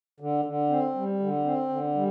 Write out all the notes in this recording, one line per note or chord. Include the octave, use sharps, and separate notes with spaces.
D3
D3
C4
G3
D3
C4
D3
G3